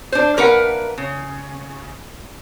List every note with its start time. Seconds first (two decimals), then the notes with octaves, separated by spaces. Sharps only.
0.12 D4 C5
0.37 A#3 A#4 B4 E5 F#5
0.98 C#3